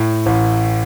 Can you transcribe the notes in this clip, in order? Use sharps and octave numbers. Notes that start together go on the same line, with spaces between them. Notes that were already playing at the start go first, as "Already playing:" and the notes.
Already playing: A2
A1